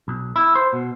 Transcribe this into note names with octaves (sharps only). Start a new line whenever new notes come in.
B1
E4
C5
B2